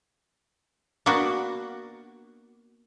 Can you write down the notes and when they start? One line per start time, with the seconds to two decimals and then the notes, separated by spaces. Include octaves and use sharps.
1.06 A#3 B3 D4 F#4